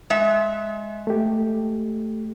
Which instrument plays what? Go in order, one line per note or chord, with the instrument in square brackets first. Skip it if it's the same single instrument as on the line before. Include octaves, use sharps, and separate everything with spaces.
[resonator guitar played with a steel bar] G#3 E5
[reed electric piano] A3 G4